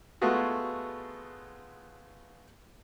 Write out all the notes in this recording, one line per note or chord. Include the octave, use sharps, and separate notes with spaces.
G#3 A3 B3 F4 F#4 G#4